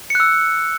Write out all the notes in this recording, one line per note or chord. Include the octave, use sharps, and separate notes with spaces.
E6 F#6 C#7